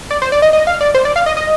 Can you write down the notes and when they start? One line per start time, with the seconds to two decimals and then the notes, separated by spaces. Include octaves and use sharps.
0.11 D5
0.22 C5
0.32 D5
0.42 D#5
0.53 D#5
0.67 F5
0.81 D5
0.95 C5
1.05 D5
1.16 F5
1.26 D#5
1.37 D#5